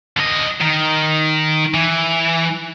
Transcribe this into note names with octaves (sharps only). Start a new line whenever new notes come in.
D3 D#5
D#3
E3